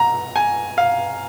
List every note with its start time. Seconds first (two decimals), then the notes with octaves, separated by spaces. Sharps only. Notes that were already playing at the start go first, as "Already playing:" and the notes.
Already playing: A#5
0.36 G#5
0.78 F5